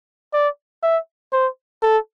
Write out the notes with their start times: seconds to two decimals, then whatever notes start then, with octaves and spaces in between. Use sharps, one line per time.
0.34 D5
0.83 E5
1.33 C5
1.83 A4